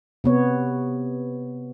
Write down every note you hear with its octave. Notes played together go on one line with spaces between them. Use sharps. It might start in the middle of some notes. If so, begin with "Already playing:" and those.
C3 B3 C#5